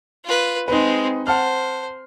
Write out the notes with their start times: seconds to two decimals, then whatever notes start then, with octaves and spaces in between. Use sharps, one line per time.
0.24 F4 B4
0.68 G#3 C4 D#4 B4
1.27 C5 F#5 A5 F6